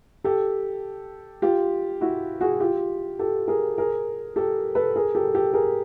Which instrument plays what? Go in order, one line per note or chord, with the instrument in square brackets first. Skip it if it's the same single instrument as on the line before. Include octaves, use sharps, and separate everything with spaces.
[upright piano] G4 A4
F4 G4
E4 F#4
F#4 G#4
F4 G4
G4 A4
G#4 A#4
G#4 A#4
G4 A4
A4 B4
G#4 A#4
G4 A4
G4 A4
G#4 A#4